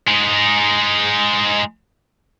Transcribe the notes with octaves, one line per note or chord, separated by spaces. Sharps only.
G#3 D#4